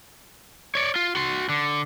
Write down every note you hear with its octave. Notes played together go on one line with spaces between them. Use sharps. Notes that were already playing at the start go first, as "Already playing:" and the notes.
C#5 D5
F4
F#4 C6
D3